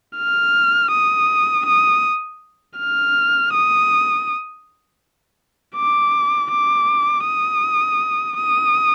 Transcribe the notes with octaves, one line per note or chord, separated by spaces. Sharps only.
F6
D#6
D#6
F6
D#6
D6
D6
D#6
D#6